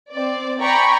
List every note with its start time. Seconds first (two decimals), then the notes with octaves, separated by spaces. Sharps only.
0.13 C4 D5
0.61 D5 G5 G#5 A#5 B5 C#6